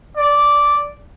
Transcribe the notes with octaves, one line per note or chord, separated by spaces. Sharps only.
D5